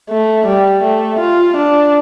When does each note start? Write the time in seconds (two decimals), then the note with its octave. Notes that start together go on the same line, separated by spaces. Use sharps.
0.10 A3
0.47 G3
0.83 A3
1.19 F4
1.57 D4